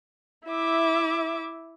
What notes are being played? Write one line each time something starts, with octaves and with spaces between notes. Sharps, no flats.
E4 E5 D6